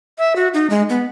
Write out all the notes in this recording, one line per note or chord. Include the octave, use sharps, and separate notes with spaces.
E5
F#4
D#4
G#3
B3